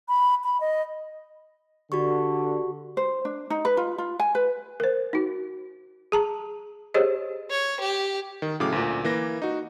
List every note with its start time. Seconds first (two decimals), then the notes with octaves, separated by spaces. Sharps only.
0.08 B5
0.44 B5
0.61 D#5
1.92 D3 F#4 G4 C#6
2.97 C5
3.25 D4
3.50 D#4
3.65 B4
3.77 F4
3.98 F4
4.20 G#5
4.35 B4
4.80 A#4 C5
5.13 D#4 F#4
6.12 G#4 A5 A#5
6.94 G4 G#4 C5 C#5 D#5
7.51 C#5
7.80 G4
8.42 D#3
8.60 A2 C#3 F#3 D6
8.72 D2 A#2
9.05 E3 A#3 A#6
9.42 D#4 F#4